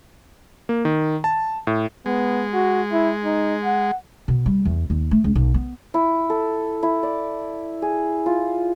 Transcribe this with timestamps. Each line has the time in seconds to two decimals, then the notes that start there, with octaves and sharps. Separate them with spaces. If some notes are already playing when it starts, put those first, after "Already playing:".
0.69 A#3
0.85 D#3
1.24 A5
1.67 A2
2.06 G#3 B3
2.54 F#4
2.92 E4
3.24 D#4
3.64 F#5
4.28 B2
4.46 G3
4.65 E2
4.90 D#2
5.11 A3
5.24 C#2
5.35 B1
5.54 B3
5.94 E4
6.30 A4
6.83 E4
7.03 D5
7.82 G#4
8.26 F4